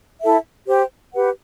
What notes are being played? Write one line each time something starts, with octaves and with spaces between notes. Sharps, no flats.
E4 A4 E5
G4 C5 G5
G4 B4 F#5